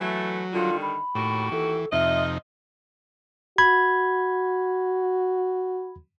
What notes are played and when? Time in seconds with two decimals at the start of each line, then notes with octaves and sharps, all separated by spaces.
0.01 E3 F#3 A3
0.53 D3 D#3 G3 F4
0.82 B5
1.15 D#2 A2 F#4 G4
1.52 E3 A4
1.92 F2 C3 D#4 F4 D#5 E5
3.58 F#4 B5 G#6